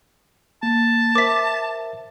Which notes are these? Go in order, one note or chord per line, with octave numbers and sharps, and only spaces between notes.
A#3 A5
A#4 C5 E5 D6 B6